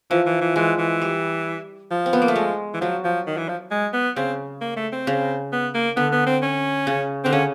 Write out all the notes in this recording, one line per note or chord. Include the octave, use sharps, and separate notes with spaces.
E3 F3
E3
E3
E3 G#3
E3
G3
F3
C4
B3
A#3
A3
G#3
E3
F3 F#3
F3
D#3
E3
F3
G#3
B3
C#3 C4
A#3
A3
C4
C#3
B3
A#3
D3 B3
B3
C4
C#4
C#3
D3 C4
C#3 C#4